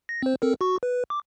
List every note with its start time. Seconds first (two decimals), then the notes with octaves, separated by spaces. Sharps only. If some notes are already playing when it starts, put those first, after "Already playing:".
0.09 A#6
0.23 C4 C5
0.42 C4 A4 A#4
0.61 F#4 C#6
0.83 B4
1.10 D6